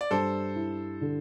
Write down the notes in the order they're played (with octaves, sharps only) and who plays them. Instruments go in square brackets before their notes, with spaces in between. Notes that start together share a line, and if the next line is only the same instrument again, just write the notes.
[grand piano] D5
[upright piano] G2 [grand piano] A4 C5
[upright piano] E4
D3